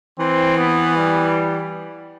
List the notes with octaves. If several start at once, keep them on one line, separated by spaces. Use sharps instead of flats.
E3 C4
B3
G3